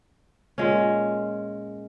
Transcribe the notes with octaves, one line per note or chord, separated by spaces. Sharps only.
A#2 G#3 C#4